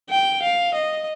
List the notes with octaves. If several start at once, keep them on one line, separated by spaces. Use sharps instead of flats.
G5
F5
D#5